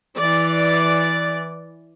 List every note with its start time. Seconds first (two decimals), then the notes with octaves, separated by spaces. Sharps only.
0.19 E3 D5